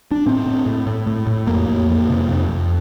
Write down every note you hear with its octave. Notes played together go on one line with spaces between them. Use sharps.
D4
A2 C4
A2
A2
A2
A2
A2
F2 A#3
F2
F2
C3
F2
F2